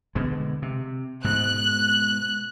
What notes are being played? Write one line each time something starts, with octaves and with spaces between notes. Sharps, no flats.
B2 D3 G#3
C3
G#2 B2 F#6